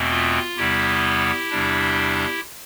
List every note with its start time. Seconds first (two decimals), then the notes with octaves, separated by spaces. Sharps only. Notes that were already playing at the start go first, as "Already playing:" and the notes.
Already playing: E2 B2 A3 C4
0.11 F4
0.57 E2 C3 G3 B3 E4 G4
1.51 E2 C3 G3 D4